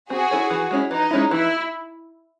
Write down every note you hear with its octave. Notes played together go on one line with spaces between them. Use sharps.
C4 F#4 G#4
E4 A4 C#5
E3
G#3 C#4 E4
E3 D#4
G#3 C#4 E4
E3 E4